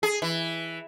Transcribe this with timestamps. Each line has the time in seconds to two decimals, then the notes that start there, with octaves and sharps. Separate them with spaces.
0.03 G#4
0.22 E3